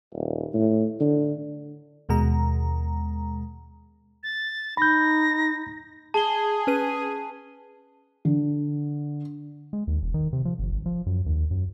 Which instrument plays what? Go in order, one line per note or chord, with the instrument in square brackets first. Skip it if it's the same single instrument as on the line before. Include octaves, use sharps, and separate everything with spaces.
[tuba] D#1
A2
D3
[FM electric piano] D#2 B2 G#3 A#5
[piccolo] A6
[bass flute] D#4 [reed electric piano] B5 G6 [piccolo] A#6
[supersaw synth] G#4 [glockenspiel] A5 G7
[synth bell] C#4 B4 D#7
[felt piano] D3
[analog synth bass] G#3
D#2
E1
D#3
C3
F3
G1
G#1
F3
F#2
D#2
F#2